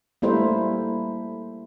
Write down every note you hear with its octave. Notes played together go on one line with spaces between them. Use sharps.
G3 A3 A#3 E4 C5